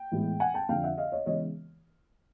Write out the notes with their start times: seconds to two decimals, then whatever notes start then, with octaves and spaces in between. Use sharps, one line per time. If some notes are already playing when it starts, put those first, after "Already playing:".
Already playing: G5
0.11 A2 E3 G#3 B3
0.40 F#5 G#5
0.54 G5 A5
0.69 F2 D3 F3 F5 G5
0.83 E5 F#5
0.97 D#5 F5
1.12 C#5 D#5
1.26 C#3 E3 G#3 B3 C#5 D#5